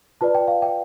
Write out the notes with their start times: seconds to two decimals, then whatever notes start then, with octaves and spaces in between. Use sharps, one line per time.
0.21 F4 B4 D5 A5
0.35 G5
0.48 F5
0.62 E5 G5